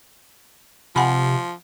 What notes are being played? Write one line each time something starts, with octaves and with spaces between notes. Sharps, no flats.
C3 F3 F#5 G#5 B5